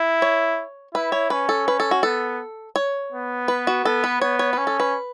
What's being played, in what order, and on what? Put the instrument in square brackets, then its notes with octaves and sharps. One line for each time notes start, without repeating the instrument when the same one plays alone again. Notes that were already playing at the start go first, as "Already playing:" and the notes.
Already playing: [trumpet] E4
[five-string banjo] C#5
[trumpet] E4 [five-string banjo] B4
[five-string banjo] C#5
[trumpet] C#4 [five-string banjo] B4
[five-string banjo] A4
B4
A4
F#4
[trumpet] B3 [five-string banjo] A4
[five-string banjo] C#5
[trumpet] B3
[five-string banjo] B4
F#4
[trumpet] B3 [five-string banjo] A4
[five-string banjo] B4
[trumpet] B3 [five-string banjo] C#5
[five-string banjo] C#5
[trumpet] C#4 [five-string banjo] B4
[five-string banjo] A4
B4